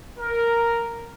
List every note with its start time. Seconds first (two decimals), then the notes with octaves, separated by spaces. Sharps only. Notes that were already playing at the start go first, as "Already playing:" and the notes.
0.18 A#4